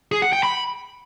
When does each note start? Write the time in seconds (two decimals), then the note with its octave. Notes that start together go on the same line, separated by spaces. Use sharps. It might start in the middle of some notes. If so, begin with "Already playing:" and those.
0.12 G#4
0.22 F#5
0.33 G5
0.43 B5